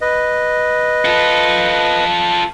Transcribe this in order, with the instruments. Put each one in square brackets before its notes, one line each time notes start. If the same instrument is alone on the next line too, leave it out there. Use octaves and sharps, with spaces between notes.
[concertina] B4 D#5
[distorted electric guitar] F4 A4